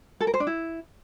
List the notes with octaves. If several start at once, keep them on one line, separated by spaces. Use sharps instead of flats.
A4
A#4
C5
D4
E4